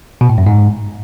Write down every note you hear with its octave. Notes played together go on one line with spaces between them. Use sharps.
B2
A2
F#2
G#2